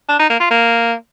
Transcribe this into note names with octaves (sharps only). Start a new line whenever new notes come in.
D4
D#4
A#3
F4
A#3